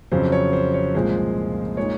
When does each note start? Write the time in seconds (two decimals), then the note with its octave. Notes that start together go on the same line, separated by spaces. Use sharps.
0.12 F2 C#3 F#3 C5
0.32 C#5
0.53 C5
0.74 C#5
0.94 C2 A#2 F3 G#3 C5
1.77 A#2 G#3 D#4 C#5